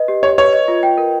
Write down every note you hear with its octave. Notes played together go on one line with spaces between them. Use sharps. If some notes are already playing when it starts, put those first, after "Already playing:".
Already playing: B4 D#5
G4
G4 C#5
B4 C#5
D#5
F4
G5
A#4